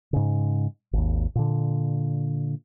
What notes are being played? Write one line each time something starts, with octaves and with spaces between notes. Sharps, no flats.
G#2 C#3
G#1 D#2
A#2 D3